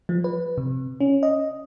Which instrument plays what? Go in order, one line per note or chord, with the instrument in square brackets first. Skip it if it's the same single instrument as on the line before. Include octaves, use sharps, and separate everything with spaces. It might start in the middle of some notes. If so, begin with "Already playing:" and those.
[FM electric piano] F3
B4
C3
C#4
D#5